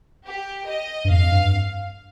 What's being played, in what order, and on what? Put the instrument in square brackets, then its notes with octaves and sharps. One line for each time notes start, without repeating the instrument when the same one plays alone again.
[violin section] G4
D#5
[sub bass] G2
[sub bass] F2 [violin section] F5
[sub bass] G2